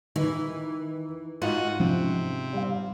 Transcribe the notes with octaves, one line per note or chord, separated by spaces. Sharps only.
D#3 E3 D#4
G#2 F4 F#4 C5 D#7
C3 F3 C#4
G3 F5